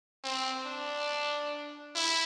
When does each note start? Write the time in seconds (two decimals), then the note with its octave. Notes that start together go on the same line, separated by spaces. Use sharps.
0.24 C4
0.66 D4
1.95 E4